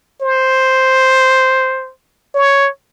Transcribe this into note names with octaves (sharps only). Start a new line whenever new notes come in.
C5
C#5